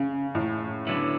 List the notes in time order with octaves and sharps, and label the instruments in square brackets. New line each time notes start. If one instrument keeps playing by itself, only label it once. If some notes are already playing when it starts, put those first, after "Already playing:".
Already playing: [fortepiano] C#3
A2
[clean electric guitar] D3 F#3 B3 E4